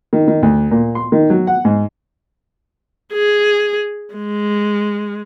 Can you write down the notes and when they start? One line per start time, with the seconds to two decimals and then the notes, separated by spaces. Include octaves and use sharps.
0.13 D#3
0.28 D#3
0.43 D2
0.71 A#2
0.95 C6
1.12 D#3
1.30 F#3
1.47 F#5
1.65 G#2
3.13 G#4
4.14 G#3